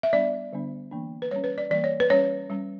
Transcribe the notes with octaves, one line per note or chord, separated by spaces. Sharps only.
E5
G3 B3 D4 D5
D3 G3 B3 D4
E3 A#3 D4
B4
G3 C#4 C#5
B4
D5
E3 G3 A#3 D5
C#5
B4
G3 C#4 C#5
G3 C#4